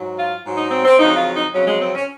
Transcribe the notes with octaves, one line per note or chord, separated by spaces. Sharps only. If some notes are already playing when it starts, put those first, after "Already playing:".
Already playing: G#2 F#3
F4
G#2 F#3
D#4
C4
C4
F2 C#3 F#3 D#4
F4
D#4
F2 C#3 F#3 C#4
G#3
C4
C#4